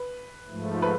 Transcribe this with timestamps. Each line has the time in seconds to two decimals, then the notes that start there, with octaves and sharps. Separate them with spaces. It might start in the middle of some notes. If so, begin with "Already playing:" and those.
Already playing: B4
0.48 G#2 F3 A3
0.82 B4